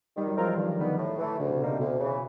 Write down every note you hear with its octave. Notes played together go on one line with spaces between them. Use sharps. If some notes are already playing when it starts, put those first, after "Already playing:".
D#3 G3
F#3
F3 G#3 C4 F4 A#4
E3
G2 D#3
D3 D#3 G3 B3
A2
E3 A3
D2 C#3
C3
B2 D3 G3 A#3 D#4
C3
D2 B2
C#3 E3